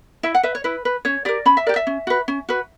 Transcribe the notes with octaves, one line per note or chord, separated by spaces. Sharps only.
E4 E5
F#5
B4 E5
C#5
E4 B4
B4
C#4 C#5
G4 A#4 D5
C#4 B5
E5
G4 A#4 D5
E5
C#4
F#4 B4
C#4
F#4 B4